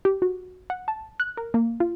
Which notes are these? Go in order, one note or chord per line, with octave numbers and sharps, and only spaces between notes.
G4
F#4
F#5
A5
F#6
A#4
A#3
F4